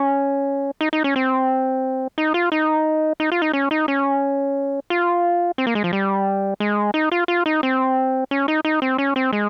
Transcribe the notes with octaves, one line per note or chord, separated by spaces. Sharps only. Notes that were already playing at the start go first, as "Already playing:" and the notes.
Already playing: C#4
D#4
D#4
C#4
C4
D#4
F4
D#4
D#4
F4
D#4
C#4
D#4
C#4
F4
C4
A#3
G#3
F3
G3
G#3
D#4
F4
F4
D#4
C4
C#4
D#4
D#4
C4
C#4
C4
G#3